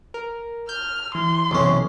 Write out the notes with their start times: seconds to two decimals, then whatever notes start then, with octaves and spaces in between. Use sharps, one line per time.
0.14 A#4
0.69 F6 G6
1.15 E3 C6
1.51 B1 F#2 C3 E3 C#4